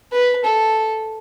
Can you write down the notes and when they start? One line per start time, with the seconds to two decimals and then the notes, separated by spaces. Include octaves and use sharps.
0.12 B4
0.45 A4